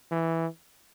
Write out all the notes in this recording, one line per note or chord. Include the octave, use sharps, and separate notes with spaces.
E3